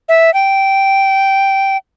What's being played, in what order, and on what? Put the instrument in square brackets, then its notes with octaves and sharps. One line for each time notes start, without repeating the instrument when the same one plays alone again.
[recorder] E5
G5